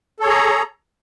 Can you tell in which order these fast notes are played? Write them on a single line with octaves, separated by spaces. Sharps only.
A4 C#5 G#4 A#5